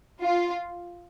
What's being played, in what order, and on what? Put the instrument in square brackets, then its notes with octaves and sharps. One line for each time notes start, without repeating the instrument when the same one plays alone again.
[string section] F4